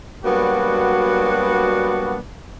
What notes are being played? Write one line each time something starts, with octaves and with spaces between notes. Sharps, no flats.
F#3 G3 A#3 B3 D4 F#4